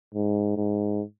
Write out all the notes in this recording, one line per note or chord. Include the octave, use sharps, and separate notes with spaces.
G#2
G#2